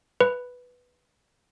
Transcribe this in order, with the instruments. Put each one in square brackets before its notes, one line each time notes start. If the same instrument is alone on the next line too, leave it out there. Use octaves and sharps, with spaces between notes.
[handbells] B4